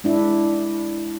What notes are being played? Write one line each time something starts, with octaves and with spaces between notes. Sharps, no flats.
G#3 D4 E4